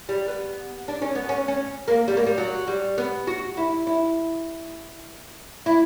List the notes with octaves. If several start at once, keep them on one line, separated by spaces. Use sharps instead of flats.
G3
B3
D4
C#4
B3
C#4
C#4
A#3
G3
A#3
G3
F#3
G3
B3
F#4
E4
E4
E4